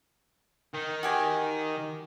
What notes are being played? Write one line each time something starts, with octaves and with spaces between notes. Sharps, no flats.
D#3
F#4 G4 G#5